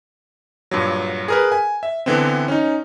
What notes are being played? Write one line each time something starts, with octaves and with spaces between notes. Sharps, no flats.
G2 A#2 F#3
G#4 A#4 B4
G#5
E5
D3 E3 B3 C4
C#4 D#4